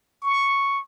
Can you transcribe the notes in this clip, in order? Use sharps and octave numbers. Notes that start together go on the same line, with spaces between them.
C#6